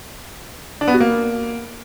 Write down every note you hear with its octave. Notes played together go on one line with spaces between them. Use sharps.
D4
B3
F#4
A#3